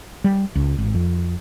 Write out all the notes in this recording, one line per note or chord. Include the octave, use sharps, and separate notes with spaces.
G3
C#2
G#1
F2